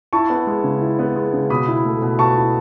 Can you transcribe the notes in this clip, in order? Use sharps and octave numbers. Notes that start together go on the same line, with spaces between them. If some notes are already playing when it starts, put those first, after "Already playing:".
E4 A5 C#6
B3
G#3
C#3
E4
B3
G#3
C#3
B2 B5 D#6
E4
A3
B2
B2 A5 C#6
E4